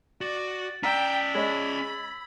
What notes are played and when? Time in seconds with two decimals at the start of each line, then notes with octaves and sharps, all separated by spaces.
0.21 F#4 D5 A6
0.83 C#4 D5 G5 A#5 E6 B6
1.35 G#3 C#5 D#5 B5 G#6 B6 F#7